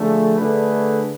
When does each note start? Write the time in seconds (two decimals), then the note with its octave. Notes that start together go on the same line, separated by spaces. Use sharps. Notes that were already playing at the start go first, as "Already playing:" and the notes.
Already playing: D3 F3 A3 D4 G#4
0.38 D3 A3 D4 G#4 B4